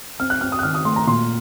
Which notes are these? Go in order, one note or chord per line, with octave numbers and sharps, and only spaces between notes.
C4 F6
F#6
C4 F6
D#6
F#6
D#3 F6
D#6
A3 C6
A#5
A#2 C6